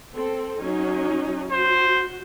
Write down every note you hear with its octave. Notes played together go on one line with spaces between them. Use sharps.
C4 A4
F#3 C#4 D#4
F#4 C5